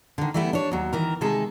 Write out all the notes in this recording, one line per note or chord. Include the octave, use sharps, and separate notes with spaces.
D3 D#3
E3 G3 A3 B3 E4
D4 C#5
D#2 F#3
D#3 E3 A#4
C3 D#3 G#3 G#4 A4